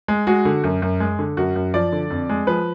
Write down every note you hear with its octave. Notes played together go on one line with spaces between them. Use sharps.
G#3
G#3 F#4
D3
F#2
F#2
G#3
D3
F#2 F#4
F#2
F3 D5
D3
F2
G#3
F3 B4